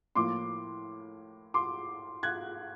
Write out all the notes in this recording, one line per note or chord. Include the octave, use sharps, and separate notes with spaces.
A2 F3 A#3 C6 D6
C6 D6
F#6 G#6